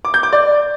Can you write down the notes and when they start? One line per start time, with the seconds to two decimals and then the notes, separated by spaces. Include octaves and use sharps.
0.05 D6
0.14 G6
0.23 D6
0.33 D5